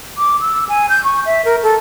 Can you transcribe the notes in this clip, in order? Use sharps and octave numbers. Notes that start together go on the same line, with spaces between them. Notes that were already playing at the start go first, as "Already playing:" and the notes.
D6
E6
G#5
G6
C#6
E5
A#4
A4